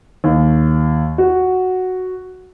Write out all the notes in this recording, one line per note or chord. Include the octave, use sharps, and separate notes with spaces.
D#2
F#4